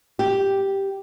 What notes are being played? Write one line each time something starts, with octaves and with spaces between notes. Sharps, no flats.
G4